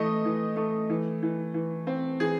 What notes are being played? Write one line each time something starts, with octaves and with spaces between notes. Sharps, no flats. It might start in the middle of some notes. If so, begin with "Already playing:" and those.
Already playing: E3 A3 D#5
E3
A3
E3
E3
E3
C4
E3 G#4